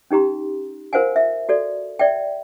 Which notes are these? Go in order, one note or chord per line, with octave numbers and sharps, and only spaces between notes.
C#4 D#4 G4 A#5 C6
F4 A#4 C5 F5 F#5 G#5
E5
F#4 A4 D5
D5 E5 G5